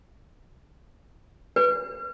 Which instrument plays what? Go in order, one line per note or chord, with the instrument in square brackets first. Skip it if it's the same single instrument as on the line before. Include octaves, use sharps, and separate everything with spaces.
[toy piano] B4